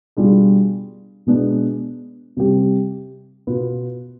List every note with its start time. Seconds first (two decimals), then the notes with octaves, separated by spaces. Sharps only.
0.17 B2 G3 D4 F4 G#4
1.26 B2 G#3 B3 D4
2.37 C3 G3 C4 G4
3.47 B2 B3 F4 B4